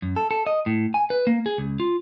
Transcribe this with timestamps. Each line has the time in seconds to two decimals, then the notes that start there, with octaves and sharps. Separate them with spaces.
0.02 F#2
0.16 A4
0.31 A4
0.47 D#5
0.66 A2
0.94 G#5
1.10 B4
1.27 A#3
1.46 G#4
1.58 C#2
1.80 F4